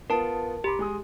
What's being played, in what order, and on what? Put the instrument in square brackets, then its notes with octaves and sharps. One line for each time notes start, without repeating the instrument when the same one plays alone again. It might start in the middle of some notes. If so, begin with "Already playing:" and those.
[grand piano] B3 F4 [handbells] A#4 A5
[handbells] G4 [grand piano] A#5 B5 D6
[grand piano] G#3 G#5 D#6